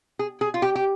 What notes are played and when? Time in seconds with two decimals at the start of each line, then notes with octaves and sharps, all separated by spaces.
0.19 G#4
0.41 G#4
0.54 F4
0.62 G4
0.75 G4